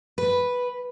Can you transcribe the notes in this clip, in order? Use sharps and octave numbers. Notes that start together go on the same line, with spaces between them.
B4